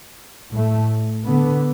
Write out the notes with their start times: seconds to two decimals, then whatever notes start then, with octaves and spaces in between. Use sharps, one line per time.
0.52 A2 A3
1.26 D3 B3